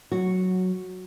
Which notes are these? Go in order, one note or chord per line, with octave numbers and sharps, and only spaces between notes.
F#3 F#4